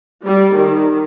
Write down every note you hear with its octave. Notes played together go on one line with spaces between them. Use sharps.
G3
D#3